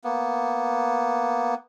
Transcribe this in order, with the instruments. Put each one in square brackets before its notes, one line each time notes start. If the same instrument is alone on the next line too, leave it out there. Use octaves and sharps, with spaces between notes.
[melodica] A#3 B3